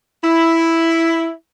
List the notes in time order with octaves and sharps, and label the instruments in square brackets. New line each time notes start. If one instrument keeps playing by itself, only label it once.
[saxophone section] E4